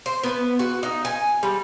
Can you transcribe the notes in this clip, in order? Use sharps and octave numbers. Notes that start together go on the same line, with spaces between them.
C5
B3
F#4
D#4
G#5
G3